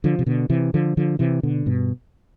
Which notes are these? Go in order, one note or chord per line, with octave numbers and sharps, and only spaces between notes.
D3 F3
C3
B2 D3
C3 E3
D3 F3
D3 F3
C3 E3
B2 D3
G2 B2